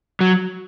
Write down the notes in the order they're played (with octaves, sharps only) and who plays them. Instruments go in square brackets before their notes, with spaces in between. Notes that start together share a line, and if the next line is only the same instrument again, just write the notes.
[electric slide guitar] F#3